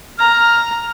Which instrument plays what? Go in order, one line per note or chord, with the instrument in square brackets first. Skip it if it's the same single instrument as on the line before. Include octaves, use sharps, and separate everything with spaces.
[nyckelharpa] A#5 [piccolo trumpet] F6